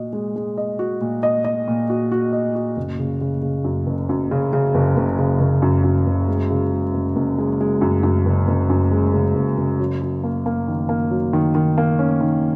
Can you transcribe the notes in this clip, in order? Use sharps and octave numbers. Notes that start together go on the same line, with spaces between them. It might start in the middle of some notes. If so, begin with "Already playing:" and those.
Already playing: A#2 F#4 D#5
G#3
G#3
D#5
F#4
A#2
D#5
D#5
A#2
F#4
F#4
D#5
F#4
F#1
C#3
C#3
C#3
F#2
F#1
F#2
C#3
C#3
F#1
F#1
C#3
F#1
F#2
F#2
F#1
G#3
C#3
G#3
F#1
F#1
G#3
G#3
F#2
F#2
F#1
F#1
F#2
G#3
C#3
F#1
F#1
F#3
F#3
A#3
A#3
D#3
A#3
F#3
D#3
D#3
A#3
C#4
D#3